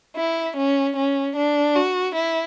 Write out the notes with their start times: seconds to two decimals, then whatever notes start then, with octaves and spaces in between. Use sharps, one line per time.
0.16 E4
0.57 C#4
0.97 C#4
1.36 D4
1.75 F#4
2.15 E4